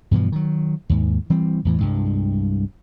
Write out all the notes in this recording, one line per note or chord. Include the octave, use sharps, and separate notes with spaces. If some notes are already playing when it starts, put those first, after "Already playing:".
G2 B2 E3 F3
D#3 F#3
D#2 G#2
E3 G3 C4
E2 A2 E3
C2 G2 G#3